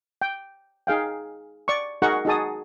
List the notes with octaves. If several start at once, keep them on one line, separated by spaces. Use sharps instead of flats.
G5
D#4 G#4 F5 G5
D5 C#6
D#4 F#4 G#4 A#4 F#5 C#6
D#4 F#4 G#4 A5 D#6